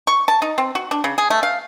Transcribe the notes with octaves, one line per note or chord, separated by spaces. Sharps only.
C#6
A5
D#4
C4
F#4
D4
C#3
G#4
A3
F5